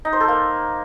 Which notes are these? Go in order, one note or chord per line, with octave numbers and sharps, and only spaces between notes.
D#4
C5
A4
A#3